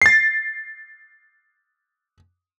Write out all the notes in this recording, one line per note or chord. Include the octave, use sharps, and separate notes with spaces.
A6 C7